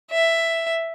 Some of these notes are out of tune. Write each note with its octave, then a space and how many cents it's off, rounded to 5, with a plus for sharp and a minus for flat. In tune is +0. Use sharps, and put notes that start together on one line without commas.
E5 +5